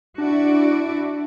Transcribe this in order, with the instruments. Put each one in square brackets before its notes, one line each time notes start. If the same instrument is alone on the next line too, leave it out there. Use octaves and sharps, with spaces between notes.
[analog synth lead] D4 [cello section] E4 F#4 D5